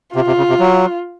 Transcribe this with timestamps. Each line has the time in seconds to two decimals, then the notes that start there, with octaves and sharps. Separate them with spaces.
0.15 C3 F4
0.27 C3
0.38 C#3
0.49 C3
0.59 F#3